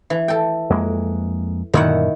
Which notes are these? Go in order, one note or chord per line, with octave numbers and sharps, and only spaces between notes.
E3
A4 G5
F2 G#3 A#3
F#2 A#2 D3 D#3 E4 F#5